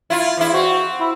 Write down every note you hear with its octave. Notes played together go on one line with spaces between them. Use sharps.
E4 F4
E2 E4
C4 F#4
E4